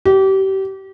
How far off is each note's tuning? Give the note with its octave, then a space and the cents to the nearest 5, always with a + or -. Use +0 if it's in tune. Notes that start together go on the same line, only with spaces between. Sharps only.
G4 -30